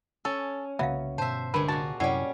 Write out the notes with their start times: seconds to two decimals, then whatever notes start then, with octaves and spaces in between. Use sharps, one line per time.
0.25 C#4 A4
0.79 C2 C#3 F#3 A#3 B3 E5 F5
1.18 G1 B2 C5 E5 A5
1.54 C2 G2 D3 G#3 A#4 B4
1.68 A#2 F#4 A5
2.00 F#2 C3 G3 C#4 E4 C#5 D5 F#5